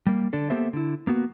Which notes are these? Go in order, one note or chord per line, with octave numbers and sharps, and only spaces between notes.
G3 A#3
D3 D4 A4
A#3 B3 G4 A4 C5 E5
D3 E4
A#3 B3 F#4